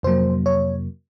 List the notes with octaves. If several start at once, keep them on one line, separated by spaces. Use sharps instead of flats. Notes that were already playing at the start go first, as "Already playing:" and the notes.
F2 C3 F#3 A#3 C5
C#5